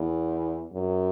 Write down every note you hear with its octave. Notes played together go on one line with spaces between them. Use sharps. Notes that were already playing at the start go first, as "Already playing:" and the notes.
Already playing: E2
F#2